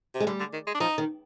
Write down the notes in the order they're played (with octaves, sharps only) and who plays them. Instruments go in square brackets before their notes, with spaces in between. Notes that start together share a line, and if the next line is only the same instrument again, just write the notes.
[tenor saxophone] C3
[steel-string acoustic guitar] G#3
[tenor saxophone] D3 [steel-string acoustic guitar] G3
[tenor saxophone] D3
D#3
G#3
D4
[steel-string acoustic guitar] F3 [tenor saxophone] D#4
[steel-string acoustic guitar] D#3